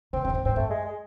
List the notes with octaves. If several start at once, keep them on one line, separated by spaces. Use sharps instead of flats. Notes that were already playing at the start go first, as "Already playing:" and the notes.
C3 C4
C3 C4
G#2
A2
G#2 C4
F#2 A3
G#3
G#3